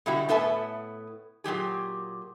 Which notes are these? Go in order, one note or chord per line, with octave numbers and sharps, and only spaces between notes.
B2 D3 G3 E4 F#4
A2 B3 A4 E5 G#5 A5
A#2 F#3 G4 G#4